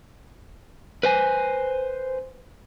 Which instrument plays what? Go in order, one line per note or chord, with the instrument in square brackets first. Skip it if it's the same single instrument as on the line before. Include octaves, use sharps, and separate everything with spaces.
[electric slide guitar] B4 C5 G#5